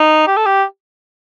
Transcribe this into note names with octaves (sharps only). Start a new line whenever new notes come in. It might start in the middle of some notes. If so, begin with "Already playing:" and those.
Already playing: D#4
G4
A4
G4